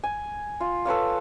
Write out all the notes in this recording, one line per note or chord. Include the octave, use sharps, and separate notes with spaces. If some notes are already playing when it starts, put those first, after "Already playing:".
G#5
F4
A4 B4 C#5 F5